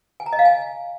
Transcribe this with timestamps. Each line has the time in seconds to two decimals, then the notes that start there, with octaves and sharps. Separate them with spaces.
0.20 G#5
0.26 A#5
0.33 D#5
0.39 F5
0.45 G#5